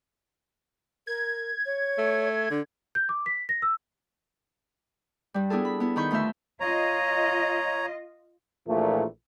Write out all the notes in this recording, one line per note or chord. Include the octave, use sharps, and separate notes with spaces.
A#4 G#6
C#5
A3
D3 D4
G6
D6
B6
A#6
E6
G2 G3
B3 D4 E4 G#4 A4
B5
B3 E4
D#3 D#4 B5 C#6 G6
D2 A3 F4 C5 E5
F4 C#5 D#5 A#5
A#1 A#2 E3 A3